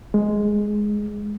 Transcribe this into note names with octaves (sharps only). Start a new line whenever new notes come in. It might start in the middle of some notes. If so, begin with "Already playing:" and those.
G#3